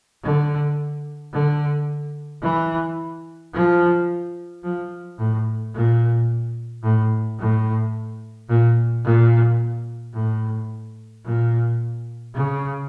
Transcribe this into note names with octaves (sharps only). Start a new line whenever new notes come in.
D3
D3
E3
F3
F3
A2
A#2
A2
A2
A#2
A#2
A2
A#2
C#3